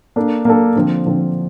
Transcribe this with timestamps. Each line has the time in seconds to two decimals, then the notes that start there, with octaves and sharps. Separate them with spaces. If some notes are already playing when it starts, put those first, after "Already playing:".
0.16 A#3 D4 A4
0.45 A#3 D4 A4
0.76 D3 F3 C4
1.05 D3 F3 C4